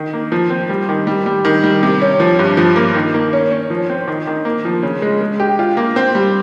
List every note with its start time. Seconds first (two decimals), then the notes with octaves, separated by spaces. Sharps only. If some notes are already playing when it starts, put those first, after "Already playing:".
Already playing: D#3
0.13 A#3
0.32 F3
0.50 C4
0.69 G3
0.89 D#3
1.07 G3
1.26 G3
1.45 D#3
1.64 G3
1.83 C3
2.02 C#4
2.20 F3
2.39 G2
2.57 F3
2.76 A#3
2.95 D#3
3.14 A#3
3.33 C#4
3.51 C#4
3.70 F3
3.90 C4
4.08 D#3
4.27 D#3
4.45 A#3
4.65 F3
4.83 C#3
5.02 G#3
5.21 G#3
5.40 G4
5.59 F4
5.77 A#3
5.96 C4
6.15 G3